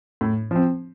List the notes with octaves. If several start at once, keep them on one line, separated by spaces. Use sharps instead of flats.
A2
F3 C4